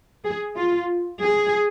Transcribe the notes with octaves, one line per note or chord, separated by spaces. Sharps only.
G#4
F4
G#4